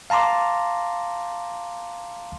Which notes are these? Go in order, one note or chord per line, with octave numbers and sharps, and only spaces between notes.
F5 A5 A#5 C6 D6